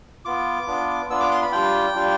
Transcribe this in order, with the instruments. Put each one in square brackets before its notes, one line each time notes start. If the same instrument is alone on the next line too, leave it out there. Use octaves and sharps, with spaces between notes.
[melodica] B3 F4 D6
B3 D4 F4
B3 D4 F4 E6
D6
C6
B5
G3 D4 F4 G5
G3 D4 F4